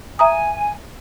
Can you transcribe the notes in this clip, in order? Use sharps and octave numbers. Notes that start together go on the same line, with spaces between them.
E5 G#5 A#5 D#6